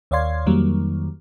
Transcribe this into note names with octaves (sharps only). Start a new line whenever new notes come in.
D#2 C#5 D5 F5 C6 G#6
F2 D#3 F#3 G3 A#3